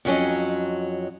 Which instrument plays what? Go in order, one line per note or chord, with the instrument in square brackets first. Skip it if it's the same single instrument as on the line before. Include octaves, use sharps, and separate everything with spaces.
[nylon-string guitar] F2 F#3 C#4 D#5